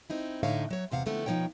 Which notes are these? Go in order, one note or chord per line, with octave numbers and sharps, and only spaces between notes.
C4 D#4 E4
A2 D3 D#4 C#5 E5 F5
F#3 C#5
E2 C3 F5 F#5
D3 F3 A3 B3 C4 E4
B2 F3 B3 D#4 C#5 G5